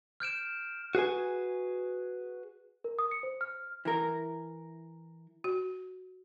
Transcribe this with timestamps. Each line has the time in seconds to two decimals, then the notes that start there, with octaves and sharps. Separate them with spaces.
0.20 F6 G6 D7 E7
0.95 F#4 G#4 B4 G#5
2.84 A#4
2.99 D#6
3.11 C#7
3.23 C5
3.41 F6
3.85 E3 A#4
5.44 F#4